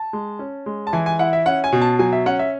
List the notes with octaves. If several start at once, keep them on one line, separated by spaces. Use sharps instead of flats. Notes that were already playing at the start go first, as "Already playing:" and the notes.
Already playing: A5
G#3
C#4
G#3
A5
E3 G#5
G#5
E4 F#5
E5
C#4 F#5
G#5
B2
A5
F#3 G#5
E5
C#4 F#5
E5